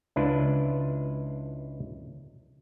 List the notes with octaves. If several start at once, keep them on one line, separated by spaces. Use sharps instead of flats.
C#2 D4 E4 F4 B4